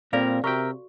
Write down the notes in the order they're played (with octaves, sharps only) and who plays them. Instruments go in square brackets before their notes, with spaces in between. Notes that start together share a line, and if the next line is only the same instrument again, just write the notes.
[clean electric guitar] A#2 G3 A#4 [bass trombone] C4 [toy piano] A4 D5 F5
[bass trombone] C3 [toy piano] F#4 C#6 [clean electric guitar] A#4 E5 G5